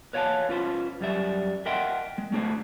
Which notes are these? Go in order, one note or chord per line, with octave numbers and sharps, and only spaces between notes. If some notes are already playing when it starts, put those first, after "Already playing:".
B4 C#5 F5 F#5 G#5 A5
C#4 F4 B4 C5
F#2 G3 E5
A#4 D#5 E5 F#5 G5 C6
G#3
A3 D4 G#4 C5